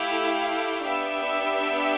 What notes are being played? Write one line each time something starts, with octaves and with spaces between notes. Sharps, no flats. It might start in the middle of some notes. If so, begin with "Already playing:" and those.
Already playing: A3 E4 G4 F5
B3 D4 G4 E5